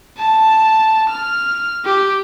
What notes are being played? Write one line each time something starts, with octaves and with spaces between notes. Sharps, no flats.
A5
F6
G4